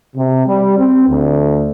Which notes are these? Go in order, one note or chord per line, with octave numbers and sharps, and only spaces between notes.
C3
G3
C4
D2